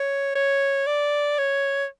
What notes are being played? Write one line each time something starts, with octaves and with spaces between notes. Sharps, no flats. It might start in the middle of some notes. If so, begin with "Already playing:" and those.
Already playing: C#5
C#5
D5
C#5